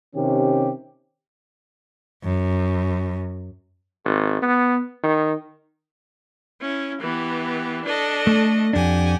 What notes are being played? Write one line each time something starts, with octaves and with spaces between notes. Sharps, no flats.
C3 D#3 C#4 G4
F#2
G#1
B3
D#3
C#4 E4
E3 B3 G4
D4 A4 D#5
A3
F2 D4 G4 F#5 G#5